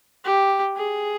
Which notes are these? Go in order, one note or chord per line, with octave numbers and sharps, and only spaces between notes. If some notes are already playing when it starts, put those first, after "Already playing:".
G4
G#4